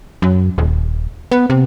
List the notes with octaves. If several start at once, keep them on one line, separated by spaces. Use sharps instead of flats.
F#2
D#1
B3
C3